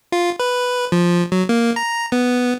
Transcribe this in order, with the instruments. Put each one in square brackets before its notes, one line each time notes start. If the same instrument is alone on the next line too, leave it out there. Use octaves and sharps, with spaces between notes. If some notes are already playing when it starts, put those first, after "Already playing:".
[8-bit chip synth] F4
B4
F3
F#3
A#3
A#5
B3